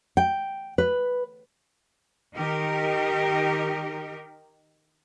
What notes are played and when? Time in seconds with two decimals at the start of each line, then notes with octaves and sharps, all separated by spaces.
0.17 G5
0.78 B4
2.37 D#3 D#4 G4 A#4